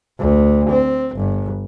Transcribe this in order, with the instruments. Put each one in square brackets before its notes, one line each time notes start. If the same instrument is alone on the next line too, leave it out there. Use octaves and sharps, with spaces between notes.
[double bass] D2
C4
G1